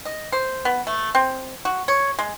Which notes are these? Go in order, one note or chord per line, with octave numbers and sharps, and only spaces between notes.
D#5
C5
B3
A3
C4
F#4
C#5
G#3